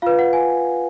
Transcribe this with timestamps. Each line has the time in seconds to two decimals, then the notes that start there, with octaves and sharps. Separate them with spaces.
0.02 F4 B4 F5
0.19 F#5
0.33 G#5